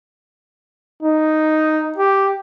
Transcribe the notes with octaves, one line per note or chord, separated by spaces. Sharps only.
D#4
G4